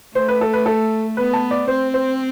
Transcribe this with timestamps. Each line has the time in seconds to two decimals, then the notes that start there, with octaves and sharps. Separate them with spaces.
0.15 A3 C5
0.28 B4
0.41 A4
0.53 B4
0.66 A4
1.17 B3 B4
1.33 A5
1.51 D5
1.68 C4 C5
1.94 C5